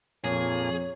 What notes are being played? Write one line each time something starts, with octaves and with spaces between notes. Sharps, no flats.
F2 A#2 F3 G#4 C#5